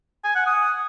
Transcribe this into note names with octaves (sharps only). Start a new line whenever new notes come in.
G#5
F#5
D#6